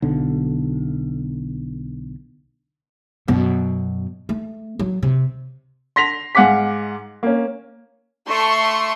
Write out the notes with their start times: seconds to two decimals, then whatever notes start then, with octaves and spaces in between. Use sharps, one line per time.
0.02 B1 D3
3.28 F#2 B2
4.29 A3
4.79 F#3
5.03 C3
5.96 C6 A#6 B6 F7
6.35 G#2 F5 F#5 G#5 D6 B6
7.23 A#3 C#4
8.28 A3 C6 C#6